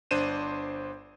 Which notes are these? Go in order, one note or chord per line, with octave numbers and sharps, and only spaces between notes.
G1 D4 C5 D#7 E7